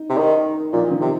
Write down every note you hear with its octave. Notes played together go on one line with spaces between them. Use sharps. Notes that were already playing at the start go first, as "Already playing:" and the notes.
Already playing: D#4
C3
D#3 D#4
A#2 F3
D#3
C3